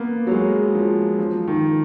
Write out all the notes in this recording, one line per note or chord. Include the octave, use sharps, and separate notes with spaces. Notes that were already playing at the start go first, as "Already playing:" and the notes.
Already playing: A#3 B3
F#3
G#3
F3
F3
D#3